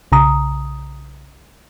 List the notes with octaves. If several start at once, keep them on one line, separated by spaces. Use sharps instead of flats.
B1 C#3 A#5 D#6